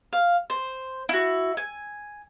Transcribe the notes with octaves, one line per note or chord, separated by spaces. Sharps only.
F5
C5
E4 F#4
G#5